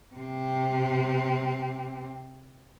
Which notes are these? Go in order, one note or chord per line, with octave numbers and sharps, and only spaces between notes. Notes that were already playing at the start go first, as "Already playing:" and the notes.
C3 C4